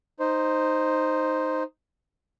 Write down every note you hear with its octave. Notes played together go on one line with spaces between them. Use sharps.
D#4 C5